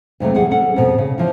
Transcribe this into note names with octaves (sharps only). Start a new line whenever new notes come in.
F2 C3 F#3 A3
E2 G3 G#4 F#5
C#4 A4 F#5
F2 B2
C#3
E3 F3